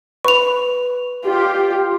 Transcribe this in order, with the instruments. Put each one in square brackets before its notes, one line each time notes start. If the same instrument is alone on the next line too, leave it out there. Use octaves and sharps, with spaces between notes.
[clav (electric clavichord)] B4 [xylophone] C#6 F7
[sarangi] F4 [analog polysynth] G4